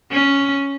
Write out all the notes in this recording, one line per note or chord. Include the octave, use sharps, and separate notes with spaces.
C#4